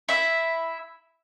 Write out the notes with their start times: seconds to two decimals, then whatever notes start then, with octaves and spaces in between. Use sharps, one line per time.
0.09 E4 E5